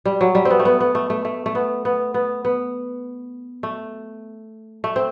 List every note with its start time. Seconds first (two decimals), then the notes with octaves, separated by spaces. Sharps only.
0.05 G3
0.21 F#3
0.35 G3
0.45 C4
0.50 B3
0.59 A3
0.65 B3
0.80 B3
0.95 A3
1.10 A3
1.25 A3
1.46 A3
1.55 B3
1.85 B3
2.14 B3
2.45 B3
3.63 A3
4.84 A3
4.96 C4